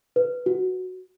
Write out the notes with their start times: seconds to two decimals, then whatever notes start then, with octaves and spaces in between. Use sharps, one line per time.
0.16 B4
0.46 F#4